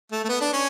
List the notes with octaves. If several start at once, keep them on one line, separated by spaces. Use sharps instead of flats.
A3
A3
B3
D4
C#4